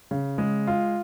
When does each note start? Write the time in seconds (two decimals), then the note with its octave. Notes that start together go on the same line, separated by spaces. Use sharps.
0.11 C#3
0.38 G#3
0.67 F4